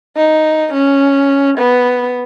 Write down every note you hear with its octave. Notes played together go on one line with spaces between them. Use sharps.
D#4
C#4
B3